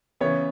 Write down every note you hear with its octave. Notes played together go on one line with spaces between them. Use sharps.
C#3 E3 B3 C#5